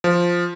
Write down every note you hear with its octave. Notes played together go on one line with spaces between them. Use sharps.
F3